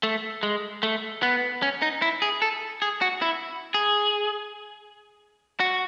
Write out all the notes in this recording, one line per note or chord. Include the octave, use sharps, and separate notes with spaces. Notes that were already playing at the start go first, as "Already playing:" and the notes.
A3
G#3
A3
B3
C#4
D#4
E4
G#4
A4
G#4
F#4
E4
G#4
F#4